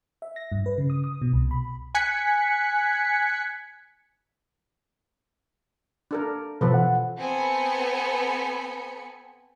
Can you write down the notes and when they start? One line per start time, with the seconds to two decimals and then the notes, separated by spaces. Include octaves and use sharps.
0.22 E5
0.36 A#6
0.52 G2
0.66 B4
0.78 C#3
0.90 D#6
1.04 D#6
1.22 B2
1.33 C2
1.51 B5
1.95 G#5 F#6 G#6 B6 C#7
6.11 D4 A4 A#4
6.61 B2 E3 F3 A4 B4
6.74 F#5
7.18 B3 C4 A4 G#5 B5 C#7